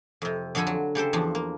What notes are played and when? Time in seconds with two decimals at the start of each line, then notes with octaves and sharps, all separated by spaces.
0.22 F2 C3
0.55 F2 D3 F3 A4 G#5 B5
0.67 F#3
0.95 C#3 G4 A4 C5
1.13 E2 F3 D4
1.35 A#3